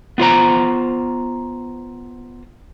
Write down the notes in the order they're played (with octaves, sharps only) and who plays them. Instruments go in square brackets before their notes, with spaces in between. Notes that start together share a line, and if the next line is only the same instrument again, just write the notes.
[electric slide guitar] B3 F4 C5 A#5